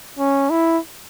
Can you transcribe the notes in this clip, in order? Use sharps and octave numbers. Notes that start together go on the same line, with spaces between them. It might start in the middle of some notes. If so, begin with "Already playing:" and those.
C#4
E4